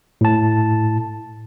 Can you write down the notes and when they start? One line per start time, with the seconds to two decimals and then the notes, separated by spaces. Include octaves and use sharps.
0.21 A2 A5